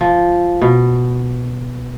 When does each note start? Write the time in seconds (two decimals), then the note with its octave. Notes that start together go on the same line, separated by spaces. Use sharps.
0.01 F3
0.62 B2